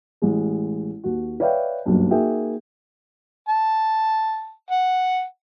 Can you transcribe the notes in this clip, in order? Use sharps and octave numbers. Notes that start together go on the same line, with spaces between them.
A1 G#3
D#2 F#4
B4 C#5 D5 E5 F5 G5
F#1 B1 G2
A#3 D#4 F#4 G#4 E5 G5
A5
F#5